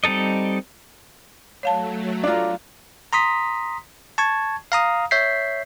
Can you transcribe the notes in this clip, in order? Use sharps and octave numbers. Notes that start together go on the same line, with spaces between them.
G3 C4 D#4 A4 D#5
F#3 A3 C#5 F5 A5
D4 F4 D5 A#5
A#5 C6 D#6 B6
A5 C#6 G#6
F5 A#5 D#6
C#5 E5 G6 B6 C7